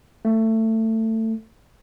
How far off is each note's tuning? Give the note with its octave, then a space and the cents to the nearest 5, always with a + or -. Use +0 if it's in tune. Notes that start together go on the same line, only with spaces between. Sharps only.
A3 +20